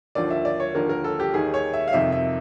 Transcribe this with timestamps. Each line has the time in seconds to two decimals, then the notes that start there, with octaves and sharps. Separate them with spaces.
0.15 D#2 D3 F3 D5
0.31 E5
0.45 D5
0.60 C#5
0.74 D#2 D3 F3 A#4
0.89 A#4
1.04 A4
1.20 G4
1.34 D#2 D#3 G#4
1.54 C#5
1.74 E5
1.88 F5
1.93 F2 C3 D#3 E5
2.12 E5